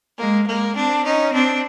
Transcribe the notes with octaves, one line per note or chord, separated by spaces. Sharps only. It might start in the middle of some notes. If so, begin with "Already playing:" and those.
G#3 A#3
G#3 A#3
C4 D4
C#4 D#4
C4 D4